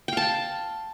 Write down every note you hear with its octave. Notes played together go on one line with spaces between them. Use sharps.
F5 G5 A5